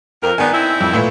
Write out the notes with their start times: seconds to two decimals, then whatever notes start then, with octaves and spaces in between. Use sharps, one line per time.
0.23 F2 A#4
0.38 D#3 G#3 B3 D5 G#5
0.53 C4 D#4 E4
0.80 F2
0.93 A#2 A3 B4